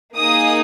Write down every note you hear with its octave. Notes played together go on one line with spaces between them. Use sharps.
A#3 D#4 G#4 D#6